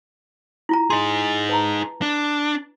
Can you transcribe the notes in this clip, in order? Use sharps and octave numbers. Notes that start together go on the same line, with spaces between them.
E4 F4 A#5
D#4 G#4 C6
B4 A5 A#5
D4